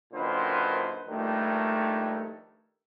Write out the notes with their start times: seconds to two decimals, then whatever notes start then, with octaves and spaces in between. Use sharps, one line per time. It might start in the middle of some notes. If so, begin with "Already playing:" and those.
0.13 F#2 A#2 D3 D#3 B4 C5
1.08 A#1 G2 D#3 A3